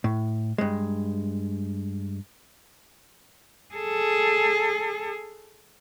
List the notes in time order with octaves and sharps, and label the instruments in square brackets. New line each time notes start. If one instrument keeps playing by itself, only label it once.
[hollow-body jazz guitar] A2
G2 G#3
[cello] G#4 A4